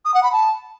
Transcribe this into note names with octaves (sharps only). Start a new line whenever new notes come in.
D#6
F#5
B5
A5